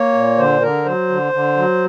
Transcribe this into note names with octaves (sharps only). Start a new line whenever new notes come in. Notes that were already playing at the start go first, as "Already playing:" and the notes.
Already playing: A#3 C#5
A#2
D3 C5
D3 A#4
F#3 C5
D3
D3
F#3